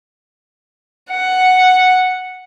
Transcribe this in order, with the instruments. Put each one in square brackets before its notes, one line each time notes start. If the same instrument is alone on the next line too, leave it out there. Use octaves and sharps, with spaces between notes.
[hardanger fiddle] F#5